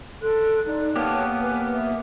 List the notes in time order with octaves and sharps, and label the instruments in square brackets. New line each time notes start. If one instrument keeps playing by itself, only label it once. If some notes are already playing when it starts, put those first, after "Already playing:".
[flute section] A4 C6 F#6
D#4 D5
[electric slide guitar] A#3 B3 G4 [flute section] C#5 A5
[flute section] B4 G#5
E5